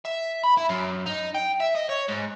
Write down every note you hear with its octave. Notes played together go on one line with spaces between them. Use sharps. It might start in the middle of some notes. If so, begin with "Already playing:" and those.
E5
B5
E4
F#2
D#4
G5
E5
D#5
C#5
G#2